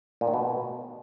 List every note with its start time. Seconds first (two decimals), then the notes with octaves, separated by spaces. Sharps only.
0.21 A#2
0.27 D#3
0.34 B2